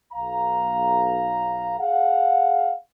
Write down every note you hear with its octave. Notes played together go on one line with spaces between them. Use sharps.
B1 F5 A#5
G#4 F5 F#5